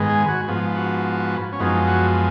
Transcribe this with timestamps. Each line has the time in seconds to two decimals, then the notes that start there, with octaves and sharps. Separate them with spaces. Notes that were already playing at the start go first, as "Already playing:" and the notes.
Already playing: G#2 D#3 G#3 B3
0.09 G#4
0.28 F#4
0.48 G#2 F3 B3
0.76 F#4
1.53 C#4
1.60 F#2 F3 G#3 B3 D#4
1.88 F#4